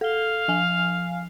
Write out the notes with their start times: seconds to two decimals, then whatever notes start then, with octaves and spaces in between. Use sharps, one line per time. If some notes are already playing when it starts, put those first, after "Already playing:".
0.01 A4 F5 G7
0.48 F3 G#5 F7